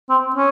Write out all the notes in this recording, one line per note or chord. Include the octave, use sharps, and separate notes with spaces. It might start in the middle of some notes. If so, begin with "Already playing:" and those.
C4
C#4